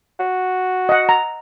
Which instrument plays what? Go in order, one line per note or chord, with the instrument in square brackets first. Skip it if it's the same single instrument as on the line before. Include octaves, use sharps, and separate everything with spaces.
[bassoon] F#4
[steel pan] D#5 F#5
A#5